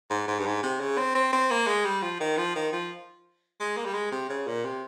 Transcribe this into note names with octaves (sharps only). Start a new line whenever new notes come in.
G#2
G#2
G2
G#2
C3
C#3
C4
C4
C4
A#3
G#3
G3
F3
D#3
F3
D#3
F3
G#3
A#3
G3
G#3
C3
C#3
A#2
C3